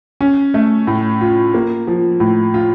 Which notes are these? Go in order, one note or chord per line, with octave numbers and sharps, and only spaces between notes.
C#4
A3
A2
F4
A#3
F3
A2
F4